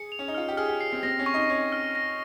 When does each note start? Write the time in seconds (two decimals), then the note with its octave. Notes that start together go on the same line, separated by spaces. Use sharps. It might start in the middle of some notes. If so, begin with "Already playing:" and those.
Already playing: G#4 C#7
0.12 F7
0.19 C#4
0.28 D#4
0.34 F4 F6
0.48 G4
0.57 G#4 F6
0.69 G4
0.80 C7
0.93 C4
1.03 C4 A#6
1.19 C#4
1.26 C#6
1.34 D#4
1.50 C#4 C#6
1.72 F6
1.95 A#6